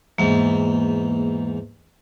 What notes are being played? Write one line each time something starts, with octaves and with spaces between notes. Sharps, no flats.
E2 G#2 A#3